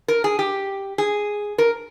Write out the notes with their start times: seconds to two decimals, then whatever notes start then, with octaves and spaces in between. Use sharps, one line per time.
0.08 A#4
0.24 G#4
0.39 G4
0.98 G#4
1.58 A#4